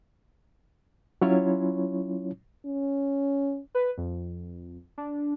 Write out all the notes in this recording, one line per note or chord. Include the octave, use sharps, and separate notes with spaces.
F#3 C#4 E4 F4 C#5
C#4
B4
F2
D4